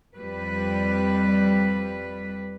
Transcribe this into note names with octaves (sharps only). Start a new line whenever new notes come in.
F2 G3 B4